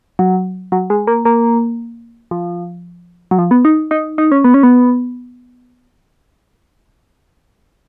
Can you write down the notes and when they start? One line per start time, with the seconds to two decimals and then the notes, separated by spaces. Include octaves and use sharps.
0.19 F#3
0.72 F#3
0.90 G#3
1.07 A#3
1.25 A#3
2.31 F3
3.31 F#3
3.39 F3
3.51 B3
3.65 D#4
3.91 D#4
4.18 D#4
4.32 C#4
4.44 B3
4.54 C#4
4.63 B3